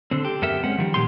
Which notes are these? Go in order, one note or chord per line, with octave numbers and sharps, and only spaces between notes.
D3 C4 A4 A5 C6
G4
F#2 B3 A4 A#4 E5
G#3 C4 C#4 F#5
D#3 F3 G3
A#2 G4 G#4 F#5 C6